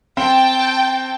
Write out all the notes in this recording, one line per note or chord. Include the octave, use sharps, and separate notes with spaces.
C4 G5 A5